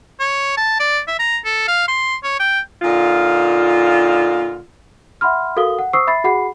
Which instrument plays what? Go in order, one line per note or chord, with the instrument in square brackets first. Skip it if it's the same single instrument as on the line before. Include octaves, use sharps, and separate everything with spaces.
[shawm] C#5
A5
D5
E5
A#5
A4
F5
C6
C#5
G5
[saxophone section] A#2 D3 D#4 F4
[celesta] E5 F#5 B5 C6 F6
F#4 A4 A#4 F5 D#6 G7
F#5
C5 C#6 D#6 E6 C7
E5 B5 A6 C7
F#4 G#4 F#5 B5 C7